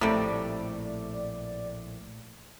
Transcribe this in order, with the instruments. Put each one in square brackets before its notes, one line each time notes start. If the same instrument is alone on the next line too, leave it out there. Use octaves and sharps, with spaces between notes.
[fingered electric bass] A#1 A2 [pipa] C3 G3 [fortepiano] A3 [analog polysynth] D5